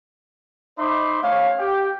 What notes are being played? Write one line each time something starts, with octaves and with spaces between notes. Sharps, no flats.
D#4 C5 E5 B5 C6 D6
A3 C#4 C#5 F5
G4 G5